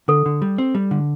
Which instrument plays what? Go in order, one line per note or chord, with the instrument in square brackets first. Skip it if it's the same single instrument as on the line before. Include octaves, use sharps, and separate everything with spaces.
[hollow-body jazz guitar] D3 [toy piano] A4
[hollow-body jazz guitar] D3
G3
C4
G3
D3